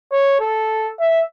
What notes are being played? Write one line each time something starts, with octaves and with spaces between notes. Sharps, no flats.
C#5
A4
E5